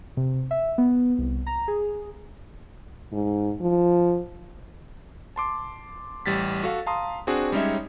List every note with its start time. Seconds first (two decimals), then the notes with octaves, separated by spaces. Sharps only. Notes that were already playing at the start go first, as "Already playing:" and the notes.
0.17 C3
0.51 E5
0.78 B3
1.19 C2
1.47 A#5
1.68 G#4
3.13 G#2
3.61 F3
5.36 A5 C6 D6
6.26 A1 G3 A6 B6
6.63 F#4 A4 F5
6.86 F5 A5 A#5 C6 D#6
7.27 C4 D4 F#4 G#4
7.52 G3 G#3 C#4 D#4 C#5 E5